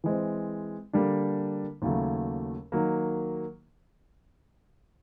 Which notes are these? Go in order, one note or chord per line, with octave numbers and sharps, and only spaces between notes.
E3 G#3 C4
D3 G3 A#3 D4
D#2 C#3 F#3 A3
D#3 F#3 A#3